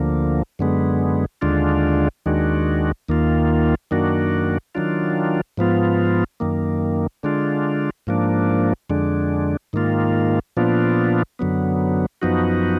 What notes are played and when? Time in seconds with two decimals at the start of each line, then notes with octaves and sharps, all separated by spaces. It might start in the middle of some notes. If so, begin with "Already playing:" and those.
Already playing: D2 D3 F3 A#3
0.59 F#2 D3 G#3 B3
1.42 D#2 D3 G#3 D4 F4
2.26 D#2 D#3 G#3 D4 F#4
3.09 D#2 D#3 A#3 F4
3.91 F#2 D#3 A#3 D4 F#4
4.75 D#3 F#3 D4 F4
5.58 G#2 F3 B3 F4
6.40 F#2 D#3 A#3
7.23 D3 G#3 D4 F4
8.07 G#2 F3 A#3 D4
8.90 F2 D3 G#3 D4
9.73 G#2 D#3 A#3 F4
10.57 A#2 F3 B3 D4 F4
11.39 F#2 D3 F#3 B3
12.22 F#2 F3 B3 D#4 F#4